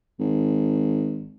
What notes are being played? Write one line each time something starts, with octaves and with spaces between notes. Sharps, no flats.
G#1